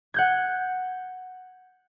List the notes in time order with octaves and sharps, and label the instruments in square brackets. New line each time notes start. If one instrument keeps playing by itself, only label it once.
[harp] F#5 G6 G#6